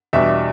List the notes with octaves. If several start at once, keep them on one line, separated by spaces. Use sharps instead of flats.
E2 B2 G3 D4 E5